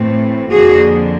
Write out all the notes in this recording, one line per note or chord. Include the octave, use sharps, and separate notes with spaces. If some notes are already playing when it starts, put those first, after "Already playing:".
Already playing: A2 E3 A3 C4
F2 D3 F3 A#3 F#4 G#4